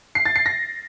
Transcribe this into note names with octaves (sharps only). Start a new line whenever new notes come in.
C7
A6
C7
A#6